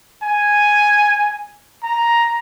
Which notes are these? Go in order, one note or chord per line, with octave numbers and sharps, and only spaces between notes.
G#5
A#5